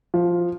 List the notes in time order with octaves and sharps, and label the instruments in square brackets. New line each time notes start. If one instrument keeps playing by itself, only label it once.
[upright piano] F3